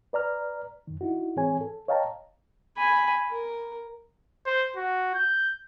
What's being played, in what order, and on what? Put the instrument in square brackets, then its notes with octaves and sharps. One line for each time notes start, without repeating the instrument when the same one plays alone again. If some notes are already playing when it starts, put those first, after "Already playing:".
[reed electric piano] B4 D5 A#5 F6
F#2 D#3
D#4 E4 F#4
G#2 E3 C4 G#4 C#5 G#5
A4
C#5 D#5 F5 G5 A5 A#5
[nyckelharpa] G#5 B5
A#4
[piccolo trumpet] C5
F#4
G6